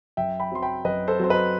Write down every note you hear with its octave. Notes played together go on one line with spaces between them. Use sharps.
F#2 E5 G5
G5 B5
F#3 C4 C6
G5 B5
F#2 B4 D#5
A4 C5
F#3 C4 C5
B4 D#5